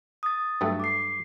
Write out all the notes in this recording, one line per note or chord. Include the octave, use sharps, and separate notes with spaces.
D#6 A6
G2 F#3 A3
D6 C7